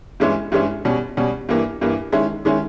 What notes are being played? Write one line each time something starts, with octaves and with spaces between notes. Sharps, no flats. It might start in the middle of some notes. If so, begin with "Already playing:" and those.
G2 E3 G#3 C#4 E4
G2 E3 G#3 C#4 E4
B2 G3 C#4
B2 G3 C#4
G2 E3 A#3
G2 E3 A#3
D#3 G#3 C#4 E4
D#3 G#3 C#4 E4